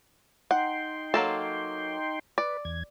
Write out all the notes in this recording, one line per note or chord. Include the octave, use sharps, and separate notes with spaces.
D#4 F#5 G5 C6
F#3 A#3 A4
B4 D5
E2 G#6